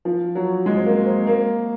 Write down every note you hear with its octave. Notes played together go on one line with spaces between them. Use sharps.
F3
F#3
G#3
C4
A#3
C4
A#3